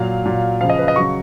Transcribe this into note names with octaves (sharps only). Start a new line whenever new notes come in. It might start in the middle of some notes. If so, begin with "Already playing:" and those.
Already playing: A#2 F#3 F5
A#2 F#3
C#3 F3 F5
D#5
B4
D#5
C#3 F#3 C#6